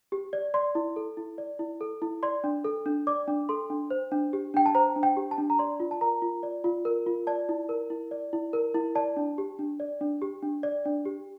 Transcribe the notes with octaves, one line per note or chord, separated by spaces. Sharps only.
G4
D5
D5 C6
E4
A4
E4
D5
E4
A4
E4
D5 C6
D4
A4
D4
D5 D6
D4
A4 C6
D4
C5
D4
G4
D4 G5
A5
C5 A#5
D4
G5
G4
A5
D4
A#5
D5 C6
F4
A5
A#4 A#5
F4
D5
F4
A#4
F4
D5 A5
E4
A#4
E4
D5
E4
A#4
E4
D5 A5
D4
G4
D4
D5
D4
G4
D4
D5
D4
G4